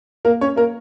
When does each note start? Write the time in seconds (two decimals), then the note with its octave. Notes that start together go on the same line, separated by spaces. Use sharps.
0.25 A#3 A#4
0.41 C#4 C#5
0.56 A#3 A#4